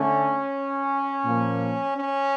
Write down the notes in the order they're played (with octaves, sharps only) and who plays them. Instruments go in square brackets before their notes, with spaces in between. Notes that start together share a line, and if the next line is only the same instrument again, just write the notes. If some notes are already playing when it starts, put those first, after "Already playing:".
Already playing: [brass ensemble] D3 A3 C#4
A#2 F3 A#3
C#4